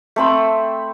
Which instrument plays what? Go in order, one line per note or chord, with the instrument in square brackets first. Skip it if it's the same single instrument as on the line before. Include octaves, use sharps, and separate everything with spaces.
[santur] A3 C4 B5